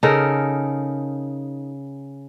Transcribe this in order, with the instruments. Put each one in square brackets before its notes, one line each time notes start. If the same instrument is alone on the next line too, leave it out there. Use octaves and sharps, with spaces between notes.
[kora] C#3 D#4 A4 A#4